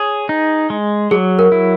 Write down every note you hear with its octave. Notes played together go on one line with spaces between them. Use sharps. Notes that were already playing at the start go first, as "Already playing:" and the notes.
Already playing: G#4 C#5
D#4
G#3
F#3 G#4
A#4
E4